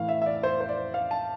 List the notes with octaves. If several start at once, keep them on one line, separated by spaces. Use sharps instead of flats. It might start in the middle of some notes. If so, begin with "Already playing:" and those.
Already playing: A2 E3 F5
E5
E5
D5
C5
C5
D5
F5
A5